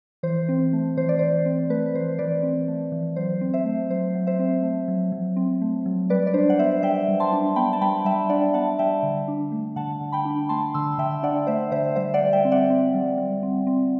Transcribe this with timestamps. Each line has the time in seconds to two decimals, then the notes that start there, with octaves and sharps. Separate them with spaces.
0.23 E3 C5
0.49 C4
0.73 A3
0.97 E3 C5
1.09 D5
1.19 E3 C5
1.46 C4
1.70 A3 B4
1.94 E3 C5
2.18 E3 B4 D5
2.43 C4
2.68 A3
2.92 E3
3.16 F#3 C5
3.41 C4
3.53 C5 E5
3.65 A3
3.90 F#3 C5
4.15 F#3
4.27 C5 E5
4.39 C4
4.63 A3
4.88 F#3
5.12 F#3
5.36 C4
5.62 A3
5.86 F#3
6.10 G3 B4 D5
6.27 D5
6.34 D4 C5
6.50 F#5
6.59 B3 C5 E5
6.83 G3 E5 G5
7.08 G3
7.20 A5 C6
7.33 D4
7.56 B3 G5 B5
7.73 A5
7.81 G3 G5 B5
8.05 G3 E5 G5
8.29 D4 D5 F#5
8.54 B3 F#5 A5
8.79 G3 E5 G5
9.03 D3
9.28 D4
9.52 A3
9.76 D3 F#5 A5
10.01 D3
10.12 G5 B5
10.25 D4
10.49 A3 A5 C6
10.74 D3 C6 E6
10.98 D3 E5 G5
11.23 D4 D5 F#5
11.47 A3 C5 E5
11.71 D3 C5 E5
11.96 G3 C5 E5
12.14 D5 F#5
12.21 G3
12.33 E5 G5
12.45 C4
12.52 D5 F#5
12.70 C4
12.94 G3
13.18 G3
13.43 C4
13.67 C4